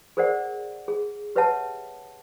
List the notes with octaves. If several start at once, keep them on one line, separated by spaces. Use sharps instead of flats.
G#4 A#4 C5 D5 F#5
G#4
G4 B4 C#5 E5 F#5 A5